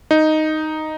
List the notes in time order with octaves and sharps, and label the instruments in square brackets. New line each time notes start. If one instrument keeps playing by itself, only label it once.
[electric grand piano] D#4